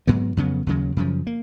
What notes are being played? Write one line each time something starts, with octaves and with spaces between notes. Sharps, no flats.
G#2 F#3 B3
F2 C#3 F#3 B3
D#2 C#3 F#3
F#2 C#3 F3
A#3